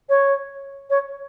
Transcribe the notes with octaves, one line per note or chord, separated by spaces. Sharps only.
C#5
C#5